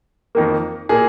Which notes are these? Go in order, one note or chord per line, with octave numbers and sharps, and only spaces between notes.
F2 D#3 A#3
A#2 A#3 G#4